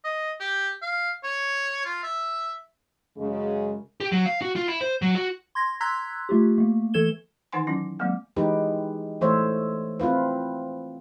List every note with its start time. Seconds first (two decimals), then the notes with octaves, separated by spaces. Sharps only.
0.04 D#5
0.40 G4
0.82 F5
1.23 C#5
1.85 F4
2.03 E5
3.17 F#2 C#3 G#3
4.00 G4
4.12 F#3
4.26 F5
4.42 F#4
4.56 F4
4.68 E4
4.81 C5
5.02 F#3
5.15 F#4
5.55 C6 G#6 A#6
5.80 A#5 C6 E6 F#6 G#6 B6
6.29 A3 F4 G4
6.58 A3 A#3
6.94 E3 A3 A4 G#6 E7 G7
7.52 D#3 E3 D#4 F#5 G#5 C6
7.67 F#3 C#4 E4
7.99 F#3 G#3 A#3 C4
8.36 E3 G#3 D#4 G4 B4
9.21 E3 A3 C5 C#5 E5
10.00 C4 E4 F4 B4